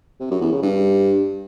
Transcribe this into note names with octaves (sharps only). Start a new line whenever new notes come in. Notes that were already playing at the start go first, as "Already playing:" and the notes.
C3
F#2
E2
C#3
G2